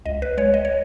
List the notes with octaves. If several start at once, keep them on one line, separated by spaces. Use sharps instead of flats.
C#2 D#5
B4
G#3 C#5
D#5
C#5